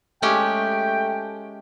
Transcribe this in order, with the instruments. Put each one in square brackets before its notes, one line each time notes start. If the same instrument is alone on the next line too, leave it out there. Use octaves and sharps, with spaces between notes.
[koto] G#3 C#4 G4 [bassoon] A3 [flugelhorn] G5